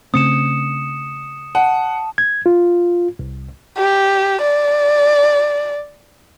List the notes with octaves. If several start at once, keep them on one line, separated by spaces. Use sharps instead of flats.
C#3 A3 C4 D#6 C#7 E7
F#5 A5
G#6
F4
C2
G4
D5